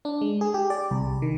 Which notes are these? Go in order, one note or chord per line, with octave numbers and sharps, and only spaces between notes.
D4
G#3
G#4
G4
D5
C2
D#3